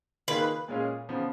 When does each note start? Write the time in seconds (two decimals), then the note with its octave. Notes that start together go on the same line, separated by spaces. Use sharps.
0.28 D#3 A#3 F4 G#4 B4
0.68 A#2 G#3 C#4 F4 G#4
1.09 C#3 F3 B3